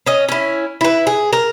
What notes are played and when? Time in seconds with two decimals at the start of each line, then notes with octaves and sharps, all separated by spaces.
0.06 C#4 D#5
0.29 C#4 E4
0.81 E4 B4
1.07 G#4
1.33 A#4